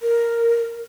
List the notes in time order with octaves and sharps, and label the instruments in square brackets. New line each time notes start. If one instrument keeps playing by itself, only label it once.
[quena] A#4